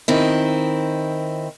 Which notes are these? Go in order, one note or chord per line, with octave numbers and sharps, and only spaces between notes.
D#3 C4 E4